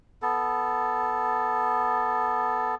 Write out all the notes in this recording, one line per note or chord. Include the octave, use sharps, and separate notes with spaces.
B3 A4